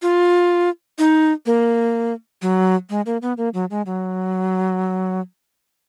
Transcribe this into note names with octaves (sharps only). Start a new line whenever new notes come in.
F4
D#4
A#3
F#3
G#3
A#3
B3
A#3
F#3
G#3
F#3